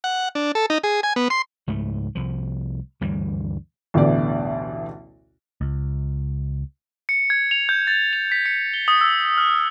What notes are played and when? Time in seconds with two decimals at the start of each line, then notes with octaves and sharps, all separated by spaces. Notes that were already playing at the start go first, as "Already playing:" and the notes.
0.04 F#5
0.35 D4
0.55 A4
0.70 D#4
0.84 G#4
1.03 G#5
1.16 B3
1.30 C6
1.67 C#2 G#2 A3
2.15 C2 F3
3.01 D2 G2 E3 G3
3.94 A1 D2 B2 D3 D5
5.61 C#2
7.09 C#7
7.30 G#6
7.51 F7
7.69 G6
7.87 A6
8.13 F7
8.32 B6
8.46 C#7
8.74 G7
8.88 D#6
9.01 E6
9.38 F6